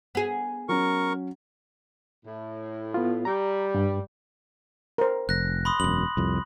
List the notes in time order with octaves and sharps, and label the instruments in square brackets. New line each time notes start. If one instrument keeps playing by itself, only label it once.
[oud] B3 G#4
[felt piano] F#3 C#4 [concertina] A#4 C#6
[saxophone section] A2
[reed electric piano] B3 F4
[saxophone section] G3 [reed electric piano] A#5
[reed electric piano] G2
[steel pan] A#4 C5
[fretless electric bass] F1 [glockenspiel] F#6 A#6
[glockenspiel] B5 C6 D#6
[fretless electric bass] E1 F#2 [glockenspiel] F#7
[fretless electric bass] C2 F2